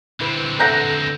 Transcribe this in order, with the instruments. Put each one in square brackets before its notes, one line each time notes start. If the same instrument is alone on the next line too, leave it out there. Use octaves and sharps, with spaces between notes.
[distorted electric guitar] D3 C4 [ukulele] E4 B4
[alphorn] A4 [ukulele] B4 E5 F#5 [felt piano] A#5 G6 A#6